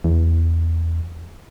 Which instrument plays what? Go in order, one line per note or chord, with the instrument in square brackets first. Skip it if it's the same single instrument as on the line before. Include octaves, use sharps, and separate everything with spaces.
[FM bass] E2